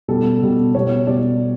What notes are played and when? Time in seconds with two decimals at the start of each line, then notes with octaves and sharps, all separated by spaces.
0.08 B2 G3 A4
0.42 B2 G3
0.75 B2 G3 C#5
1.07 B2 G3 D5